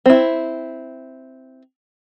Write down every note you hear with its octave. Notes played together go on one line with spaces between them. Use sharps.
C4 E4